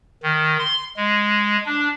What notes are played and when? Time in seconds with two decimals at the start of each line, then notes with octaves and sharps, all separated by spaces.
0.23 D#3
0.59 C6
0.97 G#3
1.66 D4